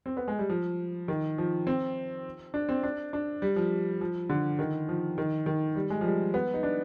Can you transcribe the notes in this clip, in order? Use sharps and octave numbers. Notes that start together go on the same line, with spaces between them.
C4
B3
G#3
G3
F3
D#3
F3
C4
D4
C4
D4
D4
G3
F3
F3
D3
D#3
F3
D#3
D#3
G3
G#3
F3
G3
B3
D#4
D4